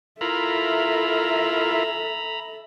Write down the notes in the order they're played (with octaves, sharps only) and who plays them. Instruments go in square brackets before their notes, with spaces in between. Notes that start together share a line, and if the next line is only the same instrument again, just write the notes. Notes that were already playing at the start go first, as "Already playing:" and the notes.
[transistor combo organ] E4 F4 A#4 [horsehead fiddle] A4 E5 [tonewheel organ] A#5 B5